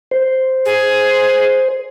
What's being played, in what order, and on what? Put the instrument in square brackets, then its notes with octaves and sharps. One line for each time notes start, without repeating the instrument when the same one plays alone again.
[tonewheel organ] C5
[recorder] G#4